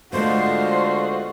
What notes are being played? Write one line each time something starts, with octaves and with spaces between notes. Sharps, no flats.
D3 G#3 A3 B3 F4 F#4 C5